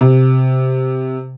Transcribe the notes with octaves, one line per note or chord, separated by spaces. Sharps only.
C3